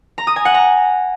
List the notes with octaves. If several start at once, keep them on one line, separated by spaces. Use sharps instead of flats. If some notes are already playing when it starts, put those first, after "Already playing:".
A#5
D#6
G#5
F#5
A#5